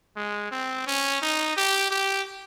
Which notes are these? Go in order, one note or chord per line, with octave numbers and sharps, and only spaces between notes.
G#3
C4
C#4
D#4
G4
G4